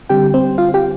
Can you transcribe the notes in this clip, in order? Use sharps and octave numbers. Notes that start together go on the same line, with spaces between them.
D3 G3 C4 G4 G5
C4 C5
F4 F5
G4 G5